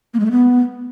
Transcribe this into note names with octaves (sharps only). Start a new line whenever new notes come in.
A#3
G#3
A3
B3